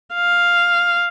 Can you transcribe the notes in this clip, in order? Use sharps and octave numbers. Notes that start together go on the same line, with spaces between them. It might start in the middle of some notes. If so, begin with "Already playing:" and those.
F5